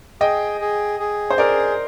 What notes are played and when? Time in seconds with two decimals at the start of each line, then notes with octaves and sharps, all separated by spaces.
0.21 G#4 D#5 G5
0.61 G#4
1.00 G#4
1.30 C5
1.38 G#4 A#4 D5